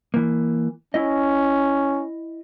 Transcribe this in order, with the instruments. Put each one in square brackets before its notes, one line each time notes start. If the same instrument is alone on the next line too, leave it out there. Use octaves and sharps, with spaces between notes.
[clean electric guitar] E3 A#3
[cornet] C#4 [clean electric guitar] E4 D#5